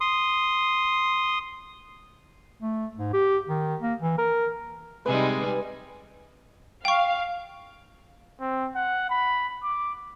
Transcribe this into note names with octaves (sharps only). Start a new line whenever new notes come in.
C6 D#6
A3
G#2
G4
D#3
A#3
E3
A#4
C3 G3 G#3 D#4 B4 G#5
F5 G5 C#6
C4
F#5
B5
D6